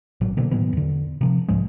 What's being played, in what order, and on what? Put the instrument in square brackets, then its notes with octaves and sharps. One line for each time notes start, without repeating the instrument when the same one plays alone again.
[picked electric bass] G#1 A#2 F#3
B2 D3 A#3
A2 D#3 F#3 B3
E2 D3
C3 F3
C2 G#2 F3 G#3